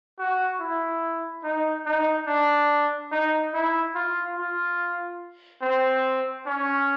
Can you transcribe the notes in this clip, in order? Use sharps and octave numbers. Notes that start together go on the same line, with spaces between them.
F#4
E4
D#4
D#4
D4
D#4
E4
F4
F4
C4
C#4